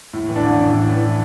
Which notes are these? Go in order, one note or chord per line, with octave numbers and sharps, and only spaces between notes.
A2
E3
D4
A1
A1
A2
E3